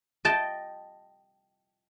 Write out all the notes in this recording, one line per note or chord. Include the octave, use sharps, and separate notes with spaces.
D#5 G5 A5